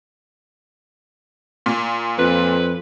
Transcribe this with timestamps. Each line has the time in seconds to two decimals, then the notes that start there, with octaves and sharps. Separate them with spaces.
1.66 A#2
2.18 F2 B4